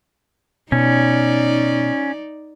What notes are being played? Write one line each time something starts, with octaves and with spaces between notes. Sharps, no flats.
B2 C#4 D#4 D5